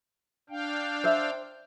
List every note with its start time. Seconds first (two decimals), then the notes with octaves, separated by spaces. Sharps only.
0.50 D4 F5 G5
1.04 C5 E5